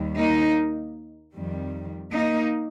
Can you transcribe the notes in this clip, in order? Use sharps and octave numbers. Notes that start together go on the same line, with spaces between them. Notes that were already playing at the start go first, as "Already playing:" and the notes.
Already playing: D#2 D#3 G3
A#3 D#4
F2 D#3 G3
A#3 D#4